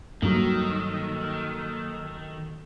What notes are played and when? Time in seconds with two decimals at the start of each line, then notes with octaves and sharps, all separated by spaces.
0.22 G2 D#3 F#3 A#3 A4